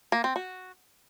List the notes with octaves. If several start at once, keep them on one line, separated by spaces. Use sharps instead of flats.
A#3
C4
F#4